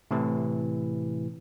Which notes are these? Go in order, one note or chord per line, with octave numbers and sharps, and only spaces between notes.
A2 C3 E3